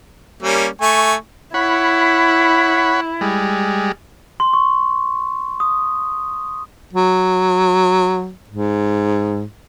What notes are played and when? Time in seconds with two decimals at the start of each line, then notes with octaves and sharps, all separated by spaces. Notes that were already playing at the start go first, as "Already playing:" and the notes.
0.42 G3 A#3 C#4
0.81 A3 G#5 C#6
1.54 E4 C#5 F#5 B5
3.21 G3 G#3
4.40 C6
4.53 C#6
5.60 D#6
6.93 F#3
8.49 G#2